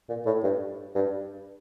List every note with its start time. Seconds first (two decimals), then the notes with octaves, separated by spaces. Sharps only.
0.09 A#2
0.26 A2
0.43 G2
0.95 G2